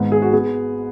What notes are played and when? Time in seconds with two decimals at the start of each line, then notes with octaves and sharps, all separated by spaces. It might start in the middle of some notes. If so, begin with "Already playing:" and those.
Already playing: G#1 G#2 G#3 B3
0.12 G#4
0.22 F#4
0.33 B3 G#4